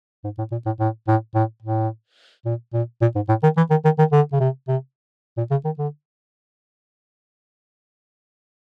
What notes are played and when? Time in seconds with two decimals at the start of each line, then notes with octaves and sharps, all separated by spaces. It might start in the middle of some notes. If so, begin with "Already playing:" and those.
0.24 G#2
0.38 A2
0.52 A#2
0.66 A2
0.80 A2
1.07 A2
1.35 A2
1.63 A2
2.45 A#2
2.73 A#2
3.01 A#2
3.15 G#2
3.29 A2
3.43 D#3
3.57 E3
3.70 D#3
3.85 D#3
3.99 D#3
4.12 D3
4.32 C#3
4.40 C3
4.68 C3
5.37 A#2
5.51 C#3
5.65 D#3
5.79 D3